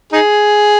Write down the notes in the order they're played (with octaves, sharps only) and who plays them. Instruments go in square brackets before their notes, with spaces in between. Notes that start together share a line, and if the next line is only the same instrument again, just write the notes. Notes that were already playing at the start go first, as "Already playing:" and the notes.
[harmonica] D#4 G#4